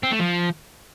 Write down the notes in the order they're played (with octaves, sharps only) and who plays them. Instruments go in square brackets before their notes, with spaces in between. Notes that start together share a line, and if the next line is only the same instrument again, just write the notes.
[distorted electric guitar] C4
A3
F3